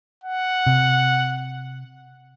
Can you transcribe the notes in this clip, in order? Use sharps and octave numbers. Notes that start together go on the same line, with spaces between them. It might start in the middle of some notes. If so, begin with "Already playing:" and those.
F#5
C3